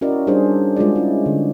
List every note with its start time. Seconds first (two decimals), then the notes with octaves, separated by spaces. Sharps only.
0.01 C#4 E4 F#4 A#4 D5 D#5
0.27 G3 D4 D#4 G#4 C5
0.76 G#3 F4 F#4 G#4 D5
0.96 C#4 E4
1.26 D3